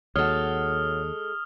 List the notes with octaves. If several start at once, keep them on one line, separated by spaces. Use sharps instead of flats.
D#2 G#3 F#4 A4 C#5 D#6 F6